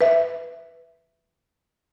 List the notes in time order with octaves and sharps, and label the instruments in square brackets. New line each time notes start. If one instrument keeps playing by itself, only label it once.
[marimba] B4 E5